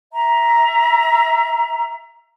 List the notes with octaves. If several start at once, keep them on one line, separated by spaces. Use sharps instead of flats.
E5 A#5